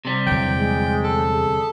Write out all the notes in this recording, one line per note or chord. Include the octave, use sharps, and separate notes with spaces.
C3 G3
E2 D3 F#3 G5
G#3
A4
G#4